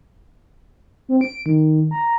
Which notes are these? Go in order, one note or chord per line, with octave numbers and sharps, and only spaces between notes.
C4
D7
D#3
A#5